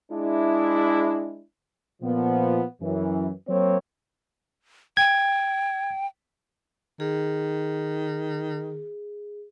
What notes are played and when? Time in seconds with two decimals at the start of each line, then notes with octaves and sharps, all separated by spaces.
0.12 G#3 D4 E4
2.02 A#2 F3 B3
2.82 F#2 E3
3.49 F#3 A#3 C4 C#5
4.97 G5 G#6
7.00 D#3 G#4